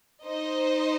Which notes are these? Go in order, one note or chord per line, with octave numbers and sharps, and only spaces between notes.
D#4 C5 D#5